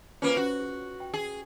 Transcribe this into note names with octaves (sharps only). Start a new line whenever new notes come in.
A#3 C#4 F4 B4 C5
F#4
G#4
G5
G#4